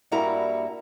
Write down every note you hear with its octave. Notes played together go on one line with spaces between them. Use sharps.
G2 G3 A#3 E4 F#4 A#5